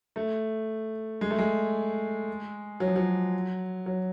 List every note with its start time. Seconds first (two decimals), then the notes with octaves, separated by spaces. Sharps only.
0.16 A3
1.21 G#3
1.30 A3
1.39 G#3
2.80 F#3
2.88 F3
2.96 F#3
3.86 F#3